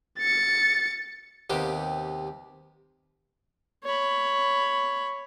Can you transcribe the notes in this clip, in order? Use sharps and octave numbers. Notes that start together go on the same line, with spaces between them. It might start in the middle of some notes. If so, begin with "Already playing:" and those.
A6 C#7
D#2 C3 B3 G4
C#5 B5